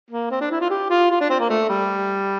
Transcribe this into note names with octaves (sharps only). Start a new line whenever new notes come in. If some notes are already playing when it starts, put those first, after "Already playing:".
A#3
C4
D4
E4
F4
G4
F4
F4
D4
C4
A#3
A3
G3